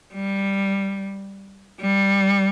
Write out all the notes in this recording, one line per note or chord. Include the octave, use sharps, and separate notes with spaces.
G3
G3